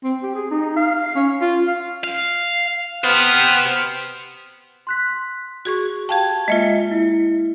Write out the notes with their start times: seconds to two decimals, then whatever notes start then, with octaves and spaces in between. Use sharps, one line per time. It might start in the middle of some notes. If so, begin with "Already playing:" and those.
0.04 C4
0.23 G4
0.35 G#4
0.51 D#4
0.76 F5
1.15 C#4
1.41 F4
1.67 F5
2.04 F5
3.04 B3 G4 C5 F6
4.87 C6 F#6 B6
5.65 F#4 G#4 C#6
6.09 G4 F5 G5 A5 G#6
6.48 G#3 A#3 F4 D#5 E5 C#7
6.91 E4